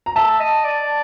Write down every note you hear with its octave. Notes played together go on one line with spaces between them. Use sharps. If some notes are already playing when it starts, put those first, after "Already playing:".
A#5
E5 A5
D#5
D5